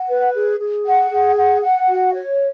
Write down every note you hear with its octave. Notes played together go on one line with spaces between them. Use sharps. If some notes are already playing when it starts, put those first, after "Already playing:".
Already playing: F#5
B4
G#4
G#4
F#5
G#4
F#5
F#5
F#4
C#5